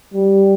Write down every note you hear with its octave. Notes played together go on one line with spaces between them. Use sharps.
G3